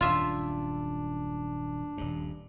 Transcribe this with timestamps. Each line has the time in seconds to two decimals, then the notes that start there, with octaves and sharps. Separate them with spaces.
0.01 D#1 F#2 D4 F4 E5
1.98 D#1 G2